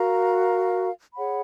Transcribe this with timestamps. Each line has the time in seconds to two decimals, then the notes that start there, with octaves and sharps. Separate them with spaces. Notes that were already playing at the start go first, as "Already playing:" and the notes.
Already playing: F#4 A#4 F5 A#5
1.15 G#4 C#5 F#5 B5